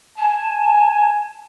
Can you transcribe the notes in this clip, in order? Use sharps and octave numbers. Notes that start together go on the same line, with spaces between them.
G#5 A5